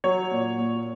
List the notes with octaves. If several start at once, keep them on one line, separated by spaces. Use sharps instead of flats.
F#3 C#5
A#2
A#2